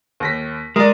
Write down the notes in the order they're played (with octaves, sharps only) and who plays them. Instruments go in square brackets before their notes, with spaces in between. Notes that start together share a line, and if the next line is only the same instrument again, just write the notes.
[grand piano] D#2 A#6 B6
[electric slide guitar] G#3 [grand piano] A#4 D5